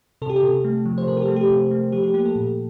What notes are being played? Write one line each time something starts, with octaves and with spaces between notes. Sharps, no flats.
C3 A4
G4
A4
C3
A3
F3
C5
C3 A#4
G4
A4
A3
G4
C3
A3
F3 G4
G4
A#3 G4
A4
A#2